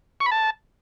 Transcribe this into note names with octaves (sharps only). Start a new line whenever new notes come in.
C#6
B5
A5